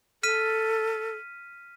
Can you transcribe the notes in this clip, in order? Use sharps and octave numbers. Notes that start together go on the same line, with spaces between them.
A4 F6 B6 D#7